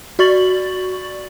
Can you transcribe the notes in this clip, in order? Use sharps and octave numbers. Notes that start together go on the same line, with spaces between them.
F#4 D5 C#6 A6 F#7